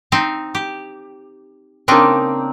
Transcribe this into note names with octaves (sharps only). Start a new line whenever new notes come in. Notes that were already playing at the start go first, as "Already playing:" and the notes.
C4 D#4 E5
G4
C#3 A#3 C4 D4 D#4